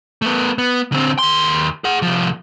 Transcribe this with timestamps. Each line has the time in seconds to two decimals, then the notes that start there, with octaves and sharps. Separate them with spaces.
0.22 A3 B3
0.58 B3
0.92 D3 C4
1.19 D#2 C6
1.84 G#4 F#5
2.02 C2 F3